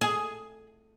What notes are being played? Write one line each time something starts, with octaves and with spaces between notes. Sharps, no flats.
G#4